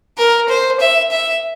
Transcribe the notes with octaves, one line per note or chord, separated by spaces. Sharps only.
A#4
C5
E5
E5